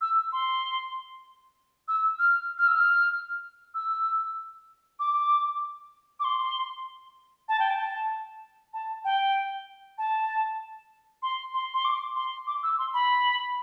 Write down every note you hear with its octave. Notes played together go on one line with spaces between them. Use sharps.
E6
C6
E6
F6
F6
E6
F6
E6
D6
D6
C6
A5
G5
A5
A5
G5
A5
C6
C6
C6
D6
C6
D6
E6
C6
B5